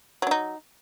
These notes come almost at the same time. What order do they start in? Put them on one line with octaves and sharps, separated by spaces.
F#3 D4 D#4